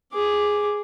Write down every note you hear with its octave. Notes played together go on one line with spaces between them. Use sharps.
G#4 D6